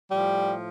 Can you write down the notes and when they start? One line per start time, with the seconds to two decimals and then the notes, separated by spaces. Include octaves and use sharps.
0.11 A2 F3 G3